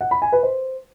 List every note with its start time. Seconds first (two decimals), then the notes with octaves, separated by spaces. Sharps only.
0.01 F#5
0.11 B5
0.22 G#5
0.32 B4
0.43 C5